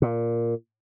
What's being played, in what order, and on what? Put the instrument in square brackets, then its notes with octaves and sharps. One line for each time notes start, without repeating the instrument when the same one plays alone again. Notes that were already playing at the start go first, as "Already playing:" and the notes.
[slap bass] A#2